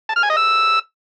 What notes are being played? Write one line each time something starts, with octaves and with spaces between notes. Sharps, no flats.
A5
F6
G#5
D#5
E6